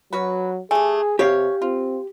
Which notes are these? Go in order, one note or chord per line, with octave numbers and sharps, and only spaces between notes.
F#3 C#4 F#4 B4
A3 G4 G#4 G#5
C3 G4 C#5 F5
C4 F4